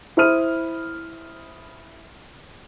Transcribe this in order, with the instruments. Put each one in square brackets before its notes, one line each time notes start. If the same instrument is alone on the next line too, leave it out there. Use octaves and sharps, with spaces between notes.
[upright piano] E4 C5 B5 D#6 F6 D#7